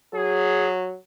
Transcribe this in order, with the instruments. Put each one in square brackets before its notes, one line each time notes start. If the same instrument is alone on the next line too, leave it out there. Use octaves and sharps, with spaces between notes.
[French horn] F#3 [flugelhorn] G#4